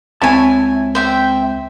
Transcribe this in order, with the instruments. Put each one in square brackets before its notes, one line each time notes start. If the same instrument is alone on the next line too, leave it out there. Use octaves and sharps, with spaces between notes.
[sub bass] C#2 [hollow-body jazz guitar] C4 C#5 A5 [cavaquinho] E4 G#5
[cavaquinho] C5 E5 G5